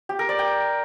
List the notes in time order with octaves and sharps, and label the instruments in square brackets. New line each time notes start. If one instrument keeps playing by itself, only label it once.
[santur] G4
A#4
D5
G5